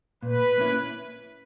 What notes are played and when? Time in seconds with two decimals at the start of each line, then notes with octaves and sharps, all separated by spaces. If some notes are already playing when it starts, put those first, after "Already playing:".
0.23 A#2 B4
0.58 A#3 C#4 E4